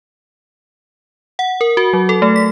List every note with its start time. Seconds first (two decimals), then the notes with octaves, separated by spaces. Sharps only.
1.39 F#5
1.61 A#4
1.77 F#4
1.93 F#3
2.09 A4
2.22 A3
2.36 B6